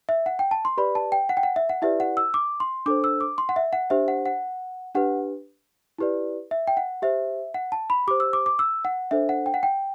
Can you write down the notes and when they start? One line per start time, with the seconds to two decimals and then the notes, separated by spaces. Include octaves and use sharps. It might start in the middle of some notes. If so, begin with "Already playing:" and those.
0.09 E5
0.26 F#5
0.39 G5
0.51 A5
0.65 C6
0.77 G4 B4 D5 B5
0.95 A5
1.12 G5
1.29 F#5
1.37 G5
1.43 F#5
1.56 E5
1.69 F#5
1.82 E4 G4 B4 D5 E5
2.00 F#5
2.17 E6
2.34 D6
2.60 C6
2.86 D4 A4 C5 D6
3.04 E6
3.21 D6
3.38 C6
3.49 F#5
3.56 E5
3.73 F#5
3.90 D4 G4 C5 E5
4.08 F#5
4.26 F#5
4.95 D4 G4 B4 F#5
5.99 E4 G4 B4 D5
6.51 E5
6.67 G5
6.77 F#5
7.02 G4 C5 E5
7.54 F#5
7.72 A5
7.90 B5
8.08 G4 C5 D6
8.20 E6
8.33 D6
8.46 D6
8.59 E6
8.85 F#5
9.11 D4 A4 C5 E5
9.29 F#5
9.46 G5
9.54 F#5
9.63 G5